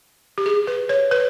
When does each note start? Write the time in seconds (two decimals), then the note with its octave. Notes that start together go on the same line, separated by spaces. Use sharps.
0.38 G4
0.46 G#4
0.67 B4
0.89 C#5
1.11 B4